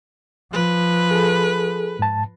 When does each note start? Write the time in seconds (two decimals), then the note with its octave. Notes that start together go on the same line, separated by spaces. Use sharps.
0.53 F3 B4
1.11 G#4 A4
1.99 G#2 A5